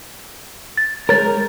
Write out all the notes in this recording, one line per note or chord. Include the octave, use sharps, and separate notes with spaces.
A6
G#3 A#4 C#5 A6